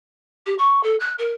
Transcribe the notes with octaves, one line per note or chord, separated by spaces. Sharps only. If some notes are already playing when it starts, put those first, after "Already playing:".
G4
C#6
A4
F#6
A#4